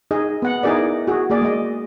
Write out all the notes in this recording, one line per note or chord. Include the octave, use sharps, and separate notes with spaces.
D#4 G#4 D#5
B3 F#5
D#4 E4 G#4 A#4 D5
F#4 G#4
A#3 G#4 D5
G#3 D#5